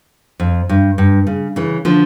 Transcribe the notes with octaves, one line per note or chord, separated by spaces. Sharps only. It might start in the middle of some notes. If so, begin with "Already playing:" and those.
F2
G2
G2
C#3
C#3 E3
D3 F3